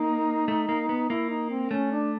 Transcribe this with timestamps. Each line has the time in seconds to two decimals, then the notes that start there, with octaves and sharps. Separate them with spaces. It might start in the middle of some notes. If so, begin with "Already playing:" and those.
Already playing: A#3 D#4
0.48 A3
0.69 A#3
0.89 B3
1.10 A#3 E4
1.30 D#4
1.50 C4
1.70 A3 C#4
1.92 D4